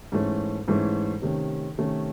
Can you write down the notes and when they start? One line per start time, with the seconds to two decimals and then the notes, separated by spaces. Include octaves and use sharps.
0.12 G#2 E3 A3 C#4
0.68 G#2 E3 A3 C#4
1.22 C3 D#3 A3 C#4
1.78 C3 D#3 A3 C#4